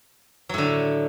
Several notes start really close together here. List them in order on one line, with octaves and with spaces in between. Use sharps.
F#3 A2 D3